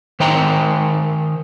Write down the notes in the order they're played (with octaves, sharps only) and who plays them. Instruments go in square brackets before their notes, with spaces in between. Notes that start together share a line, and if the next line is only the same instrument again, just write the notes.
[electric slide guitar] D#3 C5 D#5 G5 A#5